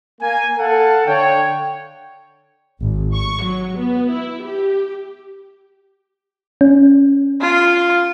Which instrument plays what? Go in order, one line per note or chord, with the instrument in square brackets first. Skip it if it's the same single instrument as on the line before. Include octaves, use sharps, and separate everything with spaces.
[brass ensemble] A#3 G#5
A4 F5 F#5 A5
D3 C#5 G5
[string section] G#1
C#6
F#3
B3
E4
G4
[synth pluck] C#4
[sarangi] F4